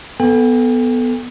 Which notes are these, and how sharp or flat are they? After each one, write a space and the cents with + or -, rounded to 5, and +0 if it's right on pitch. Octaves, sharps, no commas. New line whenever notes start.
B3 +0 A4 +0 G5 +45